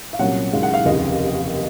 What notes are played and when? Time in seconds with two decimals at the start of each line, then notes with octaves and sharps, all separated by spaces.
0.13 F5
0.19 C2 A#2 F#3 C#4 F#5
0.52 F#1 F#2 D#3 G#3 F5
0.63 F#5
0.74 F5
0.85 F1 D#2 C#3 D#5